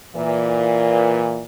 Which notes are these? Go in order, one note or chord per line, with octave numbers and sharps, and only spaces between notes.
A#2 E3